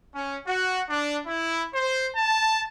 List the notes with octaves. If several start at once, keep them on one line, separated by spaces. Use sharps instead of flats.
C#4
F#4
D4
E4
C5
A5